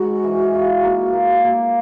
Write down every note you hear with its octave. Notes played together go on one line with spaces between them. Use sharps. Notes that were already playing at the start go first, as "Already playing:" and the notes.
Already playing: G#2 F#4
E3
F4
A#3
A#3
A#3